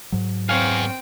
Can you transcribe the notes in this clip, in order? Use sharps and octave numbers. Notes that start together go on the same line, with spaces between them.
G#2 F#3
B3 C4 G#4 C#5 F5 G5